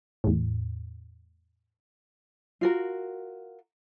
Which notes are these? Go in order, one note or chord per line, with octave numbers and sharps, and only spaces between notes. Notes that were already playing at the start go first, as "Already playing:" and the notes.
E2 A2
F4 F#4 A#4